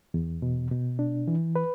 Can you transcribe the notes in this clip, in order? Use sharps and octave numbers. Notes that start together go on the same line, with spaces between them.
E2
B2
B2
D4
E3
B4